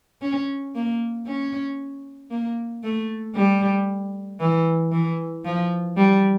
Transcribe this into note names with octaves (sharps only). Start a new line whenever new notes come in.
C#4
A#3
C#4
A#3
A3
G3
E3
E3
F3
G3